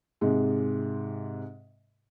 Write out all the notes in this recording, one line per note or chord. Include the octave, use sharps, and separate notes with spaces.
G#2 C3 G#3